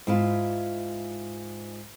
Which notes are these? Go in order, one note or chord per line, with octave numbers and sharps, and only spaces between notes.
G#2 E4 F4